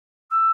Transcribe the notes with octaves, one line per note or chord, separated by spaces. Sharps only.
E6